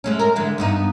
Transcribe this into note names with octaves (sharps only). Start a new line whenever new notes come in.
G#3 A3 C#4
A#4
D3 E3 G#3
G2 B3 D#4